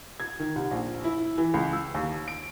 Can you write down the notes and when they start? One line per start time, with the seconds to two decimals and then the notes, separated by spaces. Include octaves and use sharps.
0.20 G#6
0.40 D#3
0.56 C2
0.71 A#1
1.04 E4
1.38 E3
1.54 C#2
1.73 E6
1.95 D#2
2.28 D7